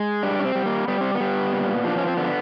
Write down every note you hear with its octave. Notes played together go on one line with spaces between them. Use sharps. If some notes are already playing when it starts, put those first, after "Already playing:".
Already playing: G#3
G3 D4
C#4
C4
G3
A#3
G3 B3
C4
B3
G3
A#2
F3 D4
C#4
C4
D3 B3